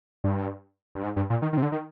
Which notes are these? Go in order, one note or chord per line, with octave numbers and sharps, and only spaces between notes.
G2
G2
G#2
G2
A#2
D#3
D#3
C3
D3
D#3